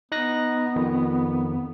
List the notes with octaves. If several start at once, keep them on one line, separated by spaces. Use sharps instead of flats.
B3 D#4 F#6 A#6
F2 D#3